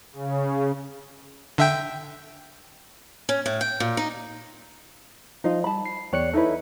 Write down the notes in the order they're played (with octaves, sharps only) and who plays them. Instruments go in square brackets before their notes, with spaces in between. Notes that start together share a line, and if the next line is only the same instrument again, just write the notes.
[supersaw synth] C#3
[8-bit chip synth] D3 E5 G5
[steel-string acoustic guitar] C#4
A2
G5
A#2
D#4
[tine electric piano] F3 [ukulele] D#4 F4 D#5
[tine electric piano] G3 [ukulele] A5 B5
[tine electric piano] C7
[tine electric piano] E2 F#6 C#7 [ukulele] C#5 D5 G5
[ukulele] D#4 E4 B4 [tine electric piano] A4 C#5